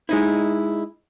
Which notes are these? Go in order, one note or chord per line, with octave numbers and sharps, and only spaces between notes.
G#3 D#4 E4